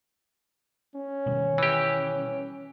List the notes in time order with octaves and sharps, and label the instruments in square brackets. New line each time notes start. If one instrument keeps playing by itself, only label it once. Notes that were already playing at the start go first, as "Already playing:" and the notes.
[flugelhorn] C#4
[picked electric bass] B2 D#3 G3
[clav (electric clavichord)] E3 G4